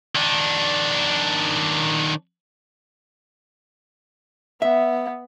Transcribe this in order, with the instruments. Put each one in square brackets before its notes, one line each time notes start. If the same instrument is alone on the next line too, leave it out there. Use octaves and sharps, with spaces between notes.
[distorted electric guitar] D#3 D4
[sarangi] B3 [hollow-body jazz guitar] E5